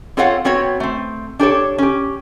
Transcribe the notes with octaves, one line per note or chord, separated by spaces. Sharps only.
C4 F4 A4 C#5 F5 F#5
B3 C4 F#4 C#5
A3 C4
D4 G4 A4 C#5
C#4 G4